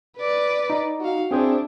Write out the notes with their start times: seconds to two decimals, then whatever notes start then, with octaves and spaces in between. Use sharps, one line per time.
0.17 B4 D5
0.70 D#4
1.01 F#4 F5
1.31 C4 D4 E4 G#4 C5